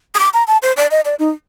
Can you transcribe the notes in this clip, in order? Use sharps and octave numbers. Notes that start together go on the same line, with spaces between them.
D#6
D6
A#5
A5
C5
D5
D#5
D5
D#4